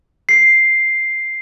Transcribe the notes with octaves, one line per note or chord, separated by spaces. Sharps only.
C7